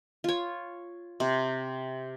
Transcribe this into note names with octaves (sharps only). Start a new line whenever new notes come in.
F4 C#5
C3